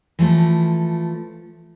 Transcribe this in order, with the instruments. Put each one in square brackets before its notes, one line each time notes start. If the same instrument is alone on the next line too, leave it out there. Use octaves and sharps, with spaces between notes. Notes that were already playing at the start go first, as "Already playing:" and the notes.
[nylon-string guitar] E3 F3 A3